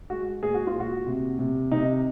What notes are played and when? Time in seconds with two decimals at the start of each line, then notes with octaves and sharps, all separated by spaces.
0.10 G#3 F#4
0.42 A#2 G#4
0.54 F#4
0.67 F4
0.75 A#2 F#4
1.07 C3
1.39 C3
1.71 C3 D#4